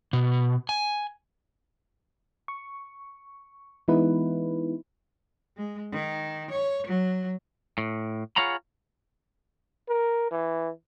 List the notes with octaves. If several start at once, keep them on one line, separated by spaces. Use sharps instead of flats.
B2
G#5
C#6
E3 G#3 B3 D#4 E4 B4
G#3
D#3
C#5
F#3
A2
F4 G#4 C#5 F#5 A#5 B5
A#4
E3